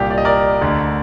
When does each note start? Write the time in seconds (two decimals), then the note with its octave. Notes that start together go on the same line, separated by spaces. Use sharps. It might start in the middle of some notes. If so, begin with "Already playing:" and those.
Already playing: C2 A#2 G4
0.10 D5
0.18 D#5
0.25 A#4 D5
0.61 D2 D3